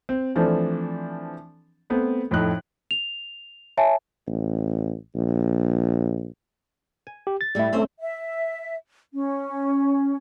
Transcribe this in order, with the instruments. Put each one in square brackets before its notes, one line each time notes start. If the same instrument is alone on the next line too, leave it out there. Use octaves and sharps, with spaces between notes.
[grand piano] C4
E3 F3 A3 C4 D4
A3 B3 C4
F2 A2 D#4 F#6
[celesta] F7
C#5 E5 G#5 A5
[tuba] A1
A#1
[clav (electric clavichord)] G#5
[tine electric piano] G4
A6
[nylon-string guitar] A2 A3 [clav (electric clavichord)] G3 E4
[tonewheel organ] A3 [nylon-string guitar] C4 C#4 C5
[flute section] E5
C#4